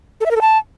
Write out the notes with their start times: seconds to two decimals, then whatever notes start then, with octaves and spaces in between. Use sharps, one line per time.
0.20 A4
0.26 E5
0.31 A#4
0.36 A4
0.41 A5